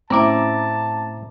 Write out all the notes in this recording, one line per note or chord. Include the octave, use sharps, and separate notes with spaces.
A2 C4 C#4 E4 A5 A#5 D6